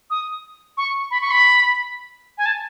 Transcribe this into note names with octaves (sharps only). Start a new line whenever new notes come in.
D#6
C#6
B5
C#6
B5
G#5
A5